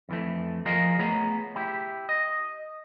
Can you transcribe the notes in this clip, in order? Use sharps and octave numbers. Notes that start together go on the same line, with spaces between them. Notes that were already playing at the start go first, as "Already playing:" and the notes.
F2 E3 A3
F3 F4 G#4 A#4 D#5 F5
A3 B3 G#4 C#5 A#5
E4 G4
D#5